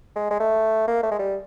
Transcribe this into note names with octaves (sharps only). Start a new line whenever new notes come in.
G#3
G#3
A3
A#3
A3
G#3
G3